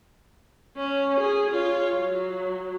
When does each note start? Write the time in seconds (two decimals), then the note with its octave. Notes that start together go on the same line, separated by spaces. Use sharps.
0.77 C#4
1.20 G#4
1.51 F4 C#5
1.96 F#3